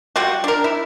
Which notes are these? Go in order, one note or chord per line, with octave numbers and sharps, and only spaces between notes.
G3 F4 F#4
D4 A#4
E4